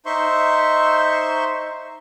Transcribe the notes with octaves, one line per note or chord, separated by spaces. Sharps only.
D#4 C5 E5 C6 C#6